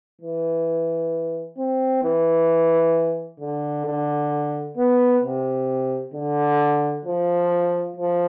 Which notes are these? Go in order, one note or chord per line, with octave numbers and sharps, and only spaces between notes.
E3
C4
E3
D3
D3
B3
C3
D3
F3
F3